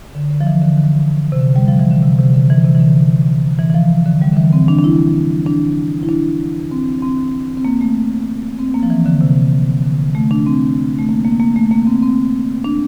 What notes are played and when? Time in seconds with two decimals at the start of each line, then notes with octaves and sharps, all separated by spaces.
0.15 D3
0.31 D3
0.41 F3
0.47 E3
0.62 D3
0.78 D3
1.32 C3
1.40 D3
1.56 G3
1.68 F3
1.79 E3
1.91 D3
2.03 C3
2.19 C3
2.34 D3
2.50 E3
2.65 C3
2.75 E3
2.80 D3
3.59 E3
3.69 E3
3.75 F3
4.06 D3
4.22 G3
4.33 D3
4.37 E3
4.53 C4
4.68 D4
4.78 D4
4.84 E4
5.46 D4
6.03 E4
6.09 D4
6.71 C4
7.02 C4
7.58 C4
7.65 A#3
7.81 A3
8.59 C4
8.74 A#3
8.83 F3
8.90 E3
9.06 D3
9.21 C3
9.84 D3
10.15 A3
10.31 D4
10.46 C4
10.99 A3
11.09 A#3
11.25 A#3
11.40 A#3
11.56 A3
11.71 A#3
11.87 C4
12.03 C4
12.64 D4